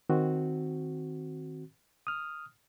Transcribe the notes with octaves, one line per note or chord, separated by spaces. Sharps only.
D#3 C4 F#4
D#6 F6